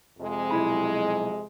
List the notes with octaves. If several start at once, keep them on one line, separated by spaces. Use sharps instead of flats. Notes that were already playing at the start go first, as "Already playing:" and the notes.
F2 C3 G#3
B1 E4 B5